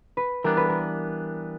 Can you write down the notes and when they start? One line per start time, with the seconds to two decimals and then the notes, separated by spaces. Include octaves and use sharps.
0.17 B4
0.44 E3 G3 B3 D4 A#4
0.57 B4
0.69 A#4